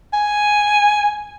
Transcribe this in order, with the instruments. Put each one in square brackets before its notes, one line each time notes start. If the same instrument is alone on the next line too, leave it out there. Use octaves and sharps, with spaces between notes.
[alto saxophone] G#5